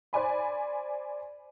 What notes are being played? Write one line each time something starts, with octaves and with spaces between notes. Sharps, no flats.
C5 D5 G#5 B5